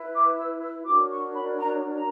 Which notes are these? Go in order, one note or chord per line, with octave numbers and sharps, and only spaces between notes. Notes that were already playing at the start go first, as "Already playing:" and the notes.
Already playing: E4 B4
D6
E6
E6
D4 F#4 A#4 C#5 D6
C#6
B5
A#5
A#5